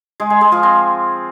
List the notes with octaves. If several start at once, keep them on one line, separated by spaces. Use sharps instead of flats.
G#3 G#4
G#3 G#4
G#3 G#4
F3 F4
C4